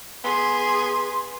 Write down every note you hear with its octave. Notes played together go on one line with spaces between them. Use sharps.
B3 G#4 C6